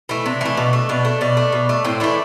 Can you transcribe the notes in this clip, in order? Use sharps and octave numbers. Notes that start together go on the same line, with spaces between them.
E3 A3
C3 D4
E3 A3
B2
A3
B2 D4
A3
B2 D4
A3
B2
A3
A2 C4
E3 A3 D4